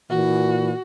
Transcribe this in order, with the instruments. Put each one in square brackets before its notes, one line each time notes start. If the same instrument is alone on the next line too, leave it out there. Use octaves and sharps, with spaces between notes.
[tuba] A#2 [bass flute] E3 [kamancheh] F#4